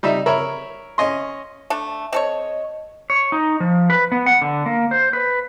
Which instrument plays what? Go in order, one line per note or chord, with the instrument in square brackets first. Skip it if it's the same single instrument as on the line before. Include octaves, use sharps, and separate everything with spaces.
[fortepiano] G3 D#4 E5
A#4 C#5 E5 B5
C#4 D#5 C6
[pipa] A3 D4 A4
[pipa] C4 A4 C#5 [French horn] D#5
[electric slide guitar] C#5
D#4
F3
B4
B3
F#5
D3
A#3
C5
B4